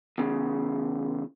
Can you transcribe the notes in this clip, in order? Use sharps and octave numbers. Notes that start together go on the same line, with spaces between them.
E2 C#3